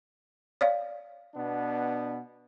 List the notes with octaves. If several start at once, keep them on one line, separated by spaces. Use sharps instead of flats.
C#5 D5 F5
B2 B3 D4